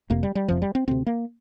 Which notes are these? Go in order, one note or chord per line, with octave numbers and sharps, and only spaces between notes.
F1 F2 C3 A#3
G3
G3
F1 F2 C3 F3
G3
C4
D2 C3 C4
A#3